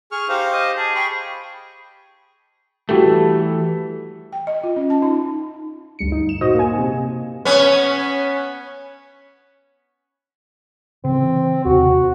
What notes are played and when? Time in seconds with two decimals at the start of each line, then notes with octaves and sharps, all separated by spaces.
0.12 G#4 C#6 F6
0.29 D#4 G4 C5 F5
0.53 D#5
0.77 G#4 A5
0.95 G#4 G5 B5 C#6
2.89 E3 G3 A3 F#4 A4
4.32 G5
4.47 D#5
4.63 F4
4.76 C#4
4.90 A5
5.02 D#4
5.99 D2 G2 C#7
6.12 D#4
6.29 E7
6.41 A#2 F#4 C5 D#5
6.55 A#3 G#5
6.78 C3
7.45 B3 C#4
11.04 C#3 E3 C4
11.65 D#2 C3 F#4